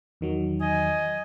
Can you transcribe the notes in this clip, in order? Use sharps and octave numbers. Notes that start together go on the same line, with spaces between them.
E2 D#3 F#3
D#5 G#5